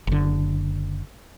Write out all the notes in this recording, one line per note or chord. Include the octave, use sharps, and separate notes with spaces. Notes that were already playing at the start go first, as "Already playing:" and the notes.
F#1 D3